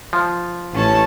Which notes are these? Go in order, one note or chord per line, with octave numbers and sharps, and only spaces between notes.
F3
A1 C#4 A5